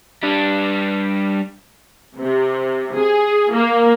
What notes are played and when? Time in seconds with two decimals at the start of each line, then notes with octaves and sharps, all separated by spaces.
0.23 G3 D4
2.19 C3
2.95 G#4
3.53 A#3